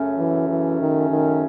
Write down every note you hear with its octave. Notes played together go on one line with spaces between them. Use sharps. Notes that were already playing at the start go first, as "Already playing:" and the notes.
Already playing: F#2 C#3 F#3 A3 C#4
E3
E3
D#3
D#3